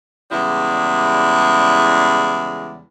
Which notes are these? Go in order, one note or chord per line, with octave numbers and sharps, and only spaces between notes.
E2 C#3 G3 G#3 E4 D5